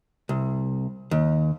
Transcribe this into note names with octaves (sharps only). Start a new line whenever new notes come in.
C2
D#2